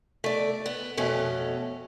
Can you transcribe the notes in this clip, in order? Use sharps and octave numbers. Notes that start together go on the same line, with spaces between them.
A3 D5
B3
F2 B2 A3 C#4